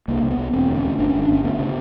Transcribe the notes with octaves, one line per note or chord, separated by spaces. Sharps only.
C2 A#3
C2
B3
C2
E1 C4
D2
C#4
D2
G1 D4
C#4
G1
D4
G1 C#4
D2 B3
C#3